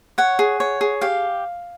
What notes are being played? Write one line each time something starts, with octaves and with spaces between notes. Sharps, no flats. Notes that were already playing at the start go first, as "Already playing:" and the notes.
C#5 F#5
G#4
C#5
G#4
G4 F5